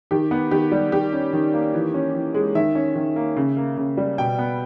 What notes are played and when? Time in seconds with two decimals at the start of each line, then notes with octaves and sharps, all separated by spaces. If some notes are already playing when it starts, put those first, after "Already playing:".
0.11 D#3 G4
0.31 B3
0.51 D#3 G4
0.72 G3
0.92 D#3 G4
1.13 C#4
1.33 D#3
1.53 A#3
1.74 E3
1.94 C#4
2.14 E3
2.34 G#3
2.55 D#3 E5
2.75 C#4
2.96 D#3
3.16 A#3
3.36 C#3
3.57 A#3
3.77 C#3
3.97 G3
4.18 B2 G5
4.39 B3